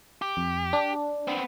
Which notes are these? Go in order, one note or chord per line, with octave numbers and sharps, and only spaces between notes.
G4
F2
D4
B3 C4